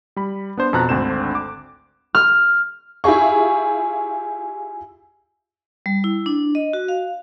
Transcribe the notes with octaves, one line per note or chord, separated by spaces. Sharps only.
G3 B5
B3 D4 C5
F2 B2 A5 A#5 F#6
G#1 D2 D3 C4 C5 E7
D6
F6
E4 F4 G4 G#4 C#6
G3
E4
D4
D#5
F#4
F5